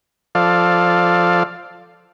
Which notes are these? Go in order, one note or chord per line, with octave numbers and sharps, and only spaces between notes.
F3 A4 D5 F5